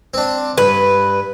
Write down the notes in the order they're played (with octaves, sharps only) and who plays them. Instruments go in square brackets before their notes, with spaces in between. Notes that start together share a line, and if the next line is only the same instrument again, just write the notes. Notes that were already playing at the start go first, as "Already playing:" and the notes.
[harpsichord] C4 D4
[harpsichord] G2 [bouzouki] B4